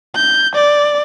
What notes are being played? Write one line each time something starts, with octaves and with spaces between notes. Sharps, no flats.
G6
D5